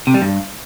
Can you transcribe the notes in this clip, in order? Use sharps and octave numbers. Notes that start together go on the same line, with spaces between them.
C3
G3
G2